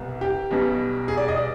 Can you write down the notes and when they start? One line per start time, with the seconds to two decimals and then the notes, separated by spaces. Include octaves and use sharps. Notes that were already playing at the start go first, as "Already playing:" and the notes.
Already playing: C2 B2 G3
0.21 G4
0.51 B1 B2 G3
1.08 G#4
1.17 D5
1.28 D#5
1.37 D5